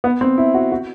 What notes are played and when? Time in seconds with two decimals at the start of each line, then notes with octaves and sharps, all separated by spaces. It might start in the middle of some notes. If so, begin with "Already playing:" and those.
0.04 B3
0.21 C4
0.38 E4
0.54 F#4
0.72 F#4